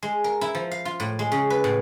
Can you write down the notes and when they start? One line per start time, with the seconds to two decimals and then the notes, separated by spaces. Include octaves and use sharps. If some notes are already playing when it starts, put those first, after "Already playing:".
0.03 G#3
0.24 A#4
0.41 E4
0.55 F3
0.71 F5
0.85 F4
1.00 A2
1.19 G#3
1.32 C#3
1.50 B4
1.64 A2